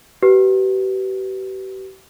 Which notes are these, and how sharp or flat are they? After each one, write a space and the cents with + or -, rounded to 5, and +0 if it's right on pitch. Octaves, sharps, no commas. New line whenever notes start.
G4 -40 B4 +0